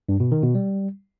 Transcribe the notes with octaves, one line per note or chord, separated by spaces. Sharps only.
G2
B2
D#3
B2
G3